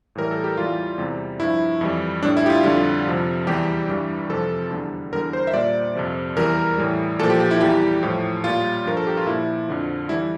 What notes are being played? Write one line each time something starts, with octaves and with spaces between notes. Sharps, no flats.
A2 E3 G3 A#4
A4
G4
E2 E3 G3 F4
E2 C3 G3
G2 F3 E4
F2 E3 G3
A2 G3 D4
E4
G4
F4
F2 D3 G3 F4
F2 C3 F3
E2 E3 G3 G4
G2 E3 G3
F2 C3 F3 A4
E2 D3 G3
E2 D3 G3 A#4
C5
E5
A#2 G3 D5
F2 C3 F3
E2 E3 G3 A#4
A2 E3 G3
A#2 F3 A4
G4
G4
E4
E2 E3 G3 G4
A2 F3
A#2 G3 F4
G2 F3 A#4
A4
G4
F4
A#2 F3 E4
F2 D3 F3
E3 G3 E4